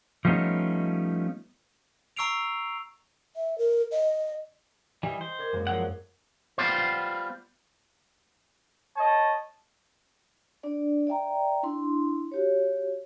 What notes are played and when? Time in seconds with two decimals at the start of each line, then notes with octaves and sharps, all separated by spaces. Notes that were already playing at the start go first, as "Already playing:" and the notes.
0.25 F3 G3 A3 B3 C#4 D#4
2.16 A#5 C#6 E6 C7 D7 F7
3.36 E5
3.58 A#4
3.92 D#5
5.03 E3 G3 D#5 G5
5.21 C5
5.39 A#4 D5 G#6
5.52 F#2 G#3 A#3
5.67 F3 F#3 F#5
6.58 G3 B3 F4 C5
8.97 C#5 D#5 A5
10.63 D4 D5
11.07 D5 E5 G5 A#5
11.63 D4 E4 C6
12.32 F#4 G4 C#5